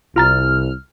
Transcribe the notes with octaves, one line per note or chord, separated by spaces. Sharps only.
C2 F4 A#5 F6 A6